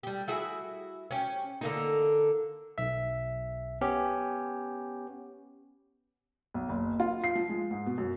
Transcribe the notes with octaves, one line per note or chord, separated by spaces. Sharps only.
G3 G4
E4 F#4 G#4
C#4 G4
D3 A#3 D#4
B1 E5
B3 C#4 G4
B1
F#1
F4
C7
F3
G#3
G#2
B2
F#2